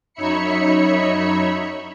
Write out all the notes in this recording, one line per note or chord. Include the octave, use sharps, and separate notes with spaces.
F#2 D#4 C#5 E5 B5 C#7